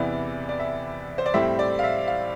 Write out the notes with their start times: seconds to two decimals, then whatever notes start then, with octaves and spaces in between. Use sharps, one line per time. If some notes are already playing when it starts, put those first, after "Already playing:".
Already playing: E2 C3 E3 B3 E4 D5
0.49 D5
0.60 E5
1.18 C5
1.26 D5
1.34 A2 G3 C4 E4 E5
1.59 D5
1.79 F5
1.84 E5
2.08 F5